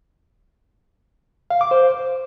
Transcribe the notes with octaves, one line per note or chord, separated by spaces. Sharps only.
F5
D6
C5